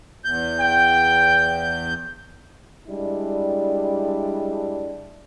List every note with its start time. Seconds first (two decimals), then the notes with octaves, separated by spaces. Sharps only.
0.24 E2 G6
0.60 G5
2.88 G3 G#3 D4 E4